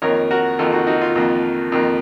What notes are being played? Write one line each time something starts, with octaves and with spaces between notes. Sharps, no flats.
F2 D#3 A#3 A#4 C#5
F#4 A#4
F2 D#3 A#3 F4 A4
D#4 F#4
D#4 F#4
F4
F2 D#3 A#3
F2 D#3 A#3